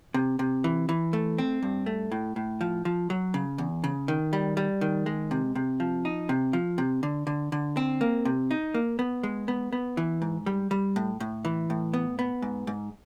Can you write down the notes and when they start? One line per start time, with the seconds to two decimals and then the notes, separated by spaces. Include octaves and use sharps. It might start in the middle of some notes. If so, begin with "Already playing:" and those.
0.14 C3
0.39 C3
0.64 E3
0.89 E3
1.13 A3
1.38 C4
1.63 G2
1.86 A3
2.12 A2
2.36 A2
2.61 F3
2.85 F3
3.10 F#3
3.34 C#3
3.58 E2
3.84 C#3
4.08 D#3
4.33 G3
4.57 G3
4.81 D#3
5.06 G#3
5.31 C3
5.55 C3
5.80 F3
6.05 D#4
6.29 C3
6.53 F3
6.78 C3
7.03 D3
7.27 D3
7.52 D3
7.77 C4
8.01 A#3
8.25 C3
8.51 D#4
8.74 A#3
8.99 B3
9.23 G#3
9.48 B3
9.73 B3
9.97 E3
10.22 G#2
10.46 G3
10.71 G3
10.96 A2
11.20 A2
11.45 E3
11.70 A2
11.94 B3
12.19 B3
12.42 G#2
12.67 G#2